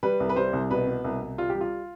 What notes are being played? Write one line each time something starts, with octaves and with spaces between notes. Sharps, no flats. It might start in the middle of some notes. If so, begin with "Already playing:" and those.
G3 B4
C2
B4
G3 C5
C2
B2 B4
B2
C2
C2
G3 F4
G4
G3
F4